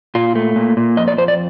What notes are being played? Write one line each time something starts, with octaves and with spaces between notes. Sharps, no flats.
A#2 F4
A3
A#2
A#2
F2 D#5
D5
F2 C5
D5